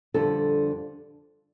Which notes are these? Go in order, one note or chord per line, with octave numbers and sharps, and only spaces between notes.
F2 D3 G3 A4